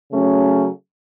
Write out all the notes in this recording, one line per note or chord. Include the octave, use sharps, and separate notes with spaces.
C#3 F#3 A3 C#4